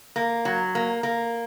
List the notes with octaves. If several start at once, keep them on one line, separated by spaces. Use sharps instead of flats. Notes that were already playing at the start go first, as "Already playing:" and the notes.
A#3
F#3
A#3
A#3